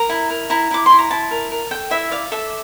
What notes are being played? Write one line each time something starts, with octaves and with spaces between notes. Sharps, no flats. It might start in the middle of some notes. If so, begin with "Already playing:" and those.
Already playing: A#4 A#5
E4
A#4
E4 A#5
E4 D6
E4 C6
A#5
E4 A5
A#4
A#4
A4 G5
E4 E5
D5 F5
A4 E5